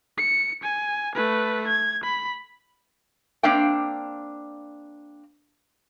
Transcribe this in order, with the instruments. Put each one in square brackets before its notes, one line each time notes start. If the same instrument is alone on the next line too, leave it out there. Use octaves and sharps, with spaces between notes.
[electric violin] C#7
G#5
A3 B4
G#6
B5
[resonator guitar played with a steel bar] A#3 C4 D4 F5 G5